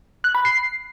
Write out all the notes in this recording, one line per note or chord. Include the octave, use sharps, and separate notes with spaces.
F#6
B5
C7